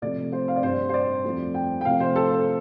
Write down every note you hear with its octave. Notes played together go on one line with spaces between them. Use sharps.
C3 F3 A3 D5
C5
F5
D5
G2 G3 C5
C5
D5
F2 F3 A3
G5
G5
C3 F3 A3 F5
C5
A4
C5